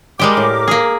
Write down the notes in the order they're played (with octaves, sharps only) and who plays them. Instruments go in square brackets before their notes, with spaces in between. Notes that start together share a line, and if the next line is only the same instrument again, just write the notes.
[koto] G3 G#3 G4 [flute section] A#4 D6
[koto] A2
A#3 G#4